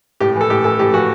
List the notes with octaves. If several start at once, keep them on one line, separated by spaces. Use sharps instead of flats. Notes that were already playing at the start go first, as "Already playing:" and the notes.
A2 G4
E3
A4
A2 G4
E3 A4
A2 G4
E3 F#4